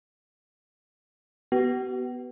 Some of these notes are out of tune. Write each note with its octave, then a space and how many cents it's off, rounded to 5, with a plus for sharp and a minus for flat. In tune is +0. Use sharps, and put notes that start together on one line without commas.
B3 +0 F#4 +45